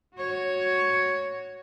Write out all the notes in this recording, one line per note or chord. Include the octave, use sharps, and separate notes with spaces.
F#4 C#5